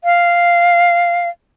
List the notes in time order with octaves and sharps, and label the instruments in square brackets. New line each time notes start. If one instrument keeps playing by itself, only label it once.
[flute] F5